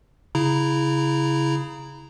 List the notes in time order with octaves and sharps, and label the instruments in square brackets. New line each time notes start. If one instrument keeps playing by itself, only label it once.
[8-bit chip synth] C#3 E4 A#5